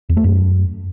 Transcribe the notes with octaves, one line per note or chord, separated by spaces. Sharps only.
E2
A3
F#2